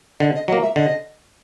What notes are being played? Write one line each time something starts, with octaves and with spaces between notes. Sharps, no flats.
D3 D#5
D#5
F#3 A#3 D#5
E5
D3 D#5